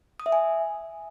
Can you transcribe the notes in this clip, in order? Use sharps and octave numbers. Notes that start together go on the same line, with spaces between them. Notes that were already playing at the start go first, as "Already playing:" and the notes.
D#6
E5
G#5